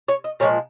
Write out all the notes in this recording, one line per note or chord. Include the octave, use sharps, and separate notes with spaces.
C#5
D#5
A#2 F3 G#3 C#5